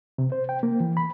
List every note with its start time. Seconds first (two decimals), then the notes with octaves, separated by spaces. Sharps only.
0.18 C3
0.32 C5
0.49 G5
0.63 A#3
0.80 E3
0.97 B5